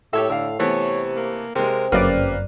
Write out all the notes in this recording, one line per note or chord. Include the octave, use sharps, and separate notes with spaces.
A2 G4 A4 C#5 E5
D3 F5 E6
C3 E3 A3 B3 C#5
A#3
C3 G#3 C4 A#4
G1 F#2 C#3 A#3 B4 D5 F6